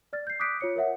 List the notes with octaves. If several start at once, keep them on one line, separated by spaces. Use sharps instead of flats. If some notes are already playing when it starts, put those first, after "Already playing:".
D5 F6 A6
G6 C7
D6 D#6 F#6 G6 B6 D7
F4 C#5 C#7
A#4 C#5 E5 F#5